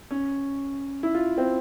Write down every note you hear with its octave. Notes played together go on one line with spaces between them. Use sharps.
C#4
E4
F4
C4